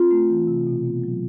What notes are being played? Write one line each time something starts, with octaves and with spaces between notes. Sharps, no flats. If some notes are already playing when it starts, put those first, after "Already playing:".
Already playing: C4 F4
A3
E3
C3
B2
B3
F#3